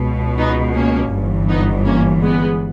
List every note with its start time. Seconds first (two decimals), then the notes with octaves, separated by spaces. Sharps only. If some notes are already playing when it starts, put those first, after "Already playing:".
Already playing: C#2 B2
0.38 B3 D#4
0.75 A#3 C#4
1.12 G1 G2 E3
1.49 B3 D#4
1.85 A#3 C#4
2.22 G#3 B3